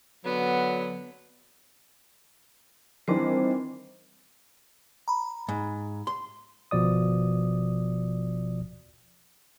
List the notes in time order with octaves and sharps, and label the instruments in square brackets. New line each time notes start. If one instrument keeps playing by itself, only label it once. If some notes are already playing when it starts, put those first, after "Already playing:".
[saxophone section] D3 F#3 [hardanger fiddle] B3
[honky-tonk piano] D#3 E3 D4 [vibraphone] G3 C4 C5
[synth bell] A#5 B5
[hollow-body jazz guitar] G#2
C6
[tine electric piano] G1 B2 F3 D5 D#6